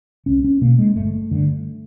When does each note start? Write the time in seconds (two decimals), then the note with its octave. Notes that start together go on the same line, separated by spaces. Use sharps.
0.26 C2 C#4
0.44 C#4
0.61 B2 A#3
0.79 G#3
0.96 G1 A3
1.31 G2 D3